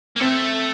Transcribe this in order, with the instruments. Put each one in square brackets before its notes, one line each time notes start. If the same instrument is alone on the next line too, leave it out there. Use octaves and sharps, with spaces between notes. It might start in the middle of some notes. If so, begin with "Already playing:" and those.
[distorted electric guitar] A#3
[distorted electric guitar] A3 [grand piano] C4